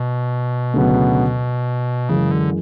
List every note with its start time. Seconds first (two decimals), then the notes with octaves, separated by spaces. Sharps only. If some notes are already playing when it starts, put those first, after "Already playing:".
Already playing: B2
0.74 D2 C#3 F#3 B3
2.09 F#2 C#3 E3 G#3
2.31 D3